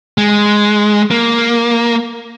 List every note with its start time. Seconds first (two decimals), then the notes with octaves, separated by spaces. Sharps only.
0.18 G#3
1.11 A#3